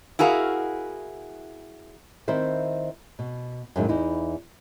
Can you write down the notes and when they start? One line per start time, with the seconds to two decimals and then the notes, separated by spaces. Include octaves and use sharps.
0.19 E4 F#4 G#4 A#4 F5
2.28 D#3 C4 E4 C5 E5
3.19 B2
3.76 F#2 A2 C#3 F#3 G#3 D#4
3.89 E2 D#4 E4